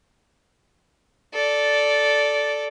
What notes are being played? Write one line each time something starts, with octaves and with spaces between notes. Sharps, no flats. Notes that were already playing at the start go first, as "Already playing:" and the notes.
A4 D5